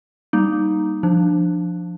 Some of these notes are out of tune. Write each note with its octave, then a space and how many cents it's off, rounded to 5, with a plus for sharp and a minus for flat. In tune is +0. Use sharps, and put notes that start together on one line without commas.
G3 +0 A#3 +10 D#4 +0
F3 +0 D4 +15